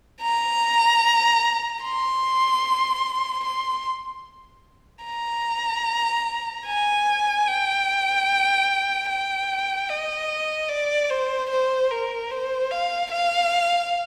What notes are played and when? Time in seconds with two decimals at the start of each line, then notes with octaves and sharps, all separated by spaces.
0.21 A#5
1.82 C6
3.44 C6
5.05 A#5
6.66 G#5
7.47 G5
9.09 G5
9.89 D#5
10.69 D5
11.10 C5
11.50 C5
11.91 A#4
12.31 C5
12.70 F5
13.11 F5